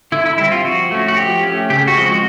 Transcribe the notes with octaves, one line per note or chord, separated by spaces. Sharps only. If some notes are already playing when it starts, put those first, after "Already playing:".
D3 E4
E4
G3 C4 E4
F4
F3 F#4
A3 C#4
F#4
F3 G4
A3 C#4
C#3 G4
F#4
F3 G#3 C4
F#4